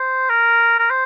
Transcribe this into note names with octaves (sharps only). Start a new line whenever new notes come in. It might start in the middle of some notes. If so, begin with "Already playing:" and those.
Already playing: C5
A#4
A#4
C5